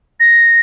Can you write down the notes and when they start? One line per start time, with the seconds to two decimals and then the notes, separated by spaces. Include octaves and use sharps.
0.20 A#6